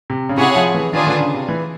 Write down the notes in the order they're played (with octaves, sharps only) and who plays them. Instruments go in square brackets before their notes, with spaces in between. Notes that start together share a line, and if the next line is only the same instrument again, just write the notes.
[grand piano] C3
C#3
[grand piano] C3 [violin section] E4 G#4 C#5 F#5
[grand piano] F3
E3
[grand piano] D#3 [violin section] D4 F4 G#4 B4
[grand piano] D3
C#3
C3
E3